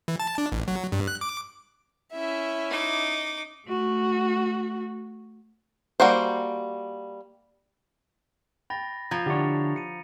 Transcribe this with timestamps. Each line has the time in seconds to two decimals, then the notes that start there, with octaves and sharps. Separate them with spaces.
0.08 E3
0.20 A5
0.38 D4
0.52 A1
0.68 F#3
0.92 G2
1.08 F#6
1.21 D6
2.14 C#4 E4 E5
2.70 D#4 D6
3.67 A3 F#4
6.00 G3 A#3 F#4 C5
8.70 G5 B5 A6 A#6
9.11 F3 A#5 G#6 A6 F7
9.26 D3 D4 E4 G4 C#5
9.76 C#7 D#7